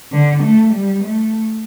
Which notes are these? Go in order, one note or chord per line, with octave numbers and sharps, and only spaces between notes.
D3
A3
G3
A3